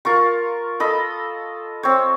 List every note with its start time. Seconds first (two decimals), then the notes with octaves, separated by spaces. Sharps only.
0.05 F4 A#4 C#6
0.80 A4 D#5 B5
1.83 C4 C#5